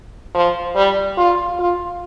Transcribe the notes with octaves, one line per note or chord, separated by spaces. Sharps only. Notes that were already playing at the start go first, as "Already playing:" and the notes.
F3
G3
F4
F4